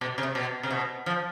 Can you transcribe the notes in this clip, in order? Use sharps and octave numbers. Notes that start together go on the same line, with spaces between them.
B2
C3
B2
C3
B2
F3